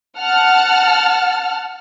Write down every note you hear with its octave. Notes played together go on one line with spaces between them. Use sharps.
F#5 A5 F6